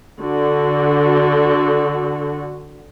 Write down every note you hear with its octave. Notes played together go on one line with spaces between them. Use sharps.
D3 F#4